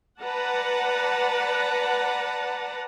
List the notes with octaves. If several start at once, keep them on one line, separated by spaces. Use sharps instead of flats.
B4 D5 F#5 A5 A#5